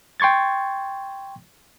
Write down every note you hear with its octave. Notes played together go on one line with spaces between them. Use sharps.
G5 C6 C#6 G#6 A6